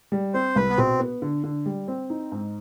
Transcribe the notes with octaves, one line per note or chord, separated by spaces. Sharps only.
G3
C4 C5
C2 B4
B3
B2 C4
B3
D3
D3
G3
C4
D#4
G#2